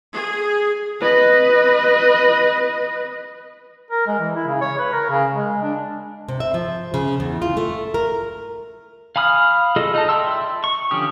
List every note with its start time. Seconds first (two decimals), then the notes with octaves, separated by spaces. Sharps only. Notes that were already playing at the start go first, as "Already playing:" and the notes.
0.14 G#4
1.01 B4 D#5
3.91 A#4
4.07 G#3
4.20 E3
4.35 E4
4.47 C#3
4.61 C#5
4.78 B4
4.92 A#4
5.10 C#3
5.34 G#3
5.63 D4
6.28 C3
6.40 E5
6.54 F3
6.94 C#3
7.20 E2
7.42 F4
7.57 A3
7.94 A#4
9.16 F5 G#5 B5 D#6 F6
9.76 F4 G#4 A4 D#5
9.94 D#4 D#5 A5
10.09 D5 E5 G5 C6 E6
10.64 C#6
10.91 D3 F3 C#4 G4 D#6